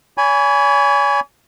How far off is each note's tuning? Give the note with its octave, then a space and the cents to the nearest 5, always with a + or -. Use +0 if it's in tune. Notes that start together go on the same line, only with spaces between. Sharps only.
C#5 +45 G#5 +0 B5 +0